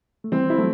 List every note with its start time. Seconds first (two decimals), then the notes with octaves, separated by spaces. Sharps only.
0.24 A3
0.32 E3 G3 C4
0.50 E4
0.58 F#3 A3